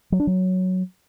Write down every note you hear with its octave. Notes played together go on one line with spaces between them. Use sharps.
F#3
D4
F#3